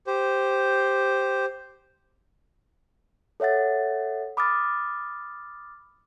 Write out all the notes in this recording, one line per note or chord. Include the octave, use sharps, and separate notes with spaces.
G4 C5
A4 C#5 E5 F#5 A6
B5 D6 D#6 F6 A6